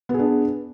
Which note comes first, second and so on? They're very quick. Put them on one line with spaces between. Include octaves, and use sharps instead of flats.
B3 G#4 D4